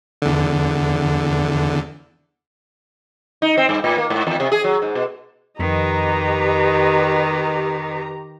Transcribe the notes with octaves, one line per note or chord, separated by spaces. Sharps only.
E2 D3
D#4
C4
G2
A2
A#3
G#2
E2
C3
G#4
F#3
G#2
B2
F2 D#3 G4 B4 D#5 A#5